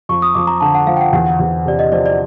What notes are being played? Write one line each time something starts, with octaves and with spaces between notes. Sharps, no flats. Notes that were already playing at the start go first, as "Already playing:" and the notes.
F2 C#6
D#6
F2 D6
A#5
D3 A5
F#5
F3 F5
G5
F#5
E2 F#5
E2
C3 D5
D#5
F3 D5
D5